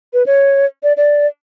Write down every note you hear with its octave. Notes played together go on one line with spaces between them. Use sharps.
B4
C#5
D5
D5